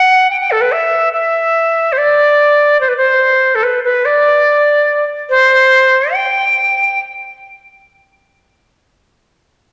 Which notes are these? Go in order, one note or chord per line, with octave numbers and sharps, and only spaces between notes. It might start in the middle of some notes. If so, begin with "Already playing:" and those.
Already playing: F#5
G5
G5
A4
B4
E5
E5
C5
D5
C5
B4
C5
A4
B4
B4
D5
C5
G5